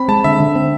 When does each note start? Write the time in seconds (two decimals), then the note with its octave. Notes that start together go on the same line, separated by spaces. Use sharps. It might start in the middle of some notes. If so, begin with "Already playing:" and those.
Already playing: C4 B5
0.08 G#3 A5
0.24 D3 E5
0.40 D3
0.55 C4